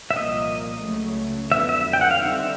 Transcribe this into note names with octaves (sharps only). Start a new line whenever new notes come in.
E5
C2 A#2 F3 A#3 D#5
C#2 C#3 F#3 A3
F2 D3 F#3 B3 E5
E5
G5
F#5
F5
D3 G3 C4 D#4 E5